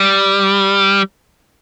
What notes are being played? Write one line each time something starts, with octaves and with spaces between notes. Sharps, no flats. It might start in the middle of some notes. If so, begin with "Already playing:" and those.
Already playing: G3